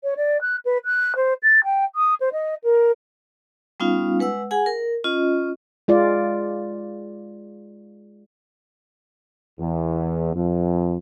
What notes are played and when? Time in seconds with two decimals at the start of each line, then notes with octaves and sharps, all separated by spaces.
0.03 C#5
0.16 D5
0.41 F#6
0.65 B4
0.85 F#6
1.15 C5
1.42 A6
1.64 G5
1.95 D#6
2.20 C5
2.32 D#5
2.63 A#4
3.80 G3 B3 C#4 D#4 F4 F5
4.19 G#3 B4 F#5 E6
4.51 G#4 F#5 G#5
4.66 A#4
5.04 C#4 F4 D#5
5.88 G#3 F4 D5
9.59 E2
10.33 F2